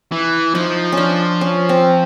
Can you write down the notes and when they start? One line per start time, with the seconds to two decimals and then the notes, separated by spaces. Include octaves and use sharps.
0.12 E3
0.54 F3 D#4
0.92 C#4 D4
1.41 C#4
1.69 C4